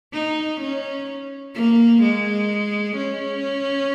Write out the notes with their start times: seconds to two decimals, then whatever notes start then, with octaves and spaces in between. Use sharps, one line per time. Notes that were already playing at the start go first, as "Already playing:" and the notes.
0.13 D#4
0.61 C#4
1.55 A#3
2.02 G#3
2.97 C#4